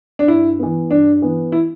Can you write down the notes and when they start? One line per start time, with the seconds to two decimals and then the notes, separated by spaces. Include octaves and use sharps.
0.19 D4
0.27 G2 E4
0.59 E3 B3
0.90 G2 D4
1.22 E3 B3
1.52 E4